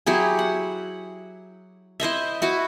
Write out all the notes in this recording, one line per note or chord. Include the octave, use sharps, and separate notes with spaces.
F#3 E4 G4 G#4
F#5
E4 C5 D#5 E5
E4 F#4 B4